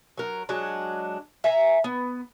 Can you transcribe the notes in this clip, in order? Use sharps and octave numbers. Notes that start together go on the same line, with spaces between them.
F#3 A#4
F#3 G#3 D4
E5 G#5 A#5
B3